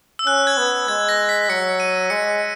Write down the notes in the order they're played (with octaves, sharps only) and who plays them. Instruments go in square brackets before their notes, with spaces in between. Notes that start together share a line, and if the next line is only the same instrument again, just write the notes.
[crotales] E6
[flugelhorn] C#4 [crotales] F#6
[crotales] G#6
[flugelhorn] B3
[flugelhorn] G#3 [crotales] G#6
[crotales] A#6
B6
[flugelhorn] F#3 [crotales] C#7
[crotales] D#7
[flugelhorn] G#3 [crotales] C#7